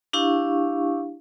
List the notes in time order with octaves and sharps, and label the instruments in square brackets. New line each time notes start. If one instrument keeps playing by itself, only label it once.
[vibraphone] D4 E4 G4 F5 C#6